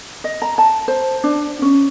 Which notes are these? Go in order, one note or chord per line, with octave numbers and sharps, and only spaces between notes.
D#5
A#5
A5
C5
D4
C#4